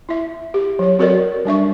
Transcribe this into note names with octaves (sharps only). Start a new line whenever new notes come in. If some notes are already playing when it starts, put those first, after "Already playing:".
E4 E5
G4
F#3 C#5
C4 F#4 A4 A#4 C#5 D5
G3 D4 E5 C#6